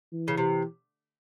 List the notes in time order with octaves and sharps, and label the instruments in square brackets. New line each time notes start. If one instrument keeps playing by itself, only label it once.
[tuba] E3
[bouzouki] C#3
C3